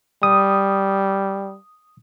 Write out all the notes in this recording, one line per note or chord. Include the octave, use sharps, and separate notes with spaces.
G3 D#6